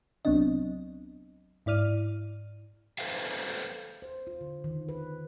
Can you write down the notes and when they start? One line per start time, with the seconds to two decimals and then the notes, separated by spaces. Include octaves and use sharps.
0.25 C2 F#3 B3 C4 D4 D#5
1.66 G#2 E4 D5 F6 D#7
2.99 A4 B4 C5 E5 F5
4.02 C5
4.27 F4
4.41 D3
4.64 D#3
4.89 B4